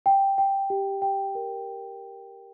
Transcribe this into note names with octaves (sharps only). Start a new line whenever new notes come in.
G5
G5
G4
G5
A#4